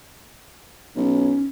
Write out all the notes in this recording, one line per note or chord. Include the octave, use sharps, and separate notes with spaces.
B1 C#4